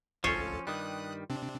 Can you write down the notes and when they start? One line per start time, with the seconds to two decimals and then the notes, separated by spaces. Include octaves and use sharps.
0.24 G#1 D2 F3 C#4 F4 A4 C5 C#5
0.67 G2 D#3 G3 D#6 F#6
1.30 C3 C4 D4